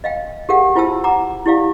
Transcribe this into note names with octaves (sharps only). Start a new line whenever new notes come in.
D#5 F5 G5
G4 G#4 A#4 F5 F#5
E4 F4 C5 G5 A5 E6
F#5 A#5 D6
E4 G4 D5 F5